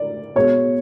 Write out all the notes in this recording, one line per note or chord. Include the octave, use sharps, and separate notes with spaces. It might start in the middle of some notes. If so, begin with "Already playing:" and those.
Already playing: D5
B2 G#3 B3 C#5